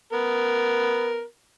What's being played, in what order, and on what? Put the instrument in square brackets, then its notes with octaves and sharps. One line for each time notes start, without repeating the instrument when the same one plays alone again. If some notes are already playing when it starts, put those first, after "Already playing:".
[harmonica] B3 A#4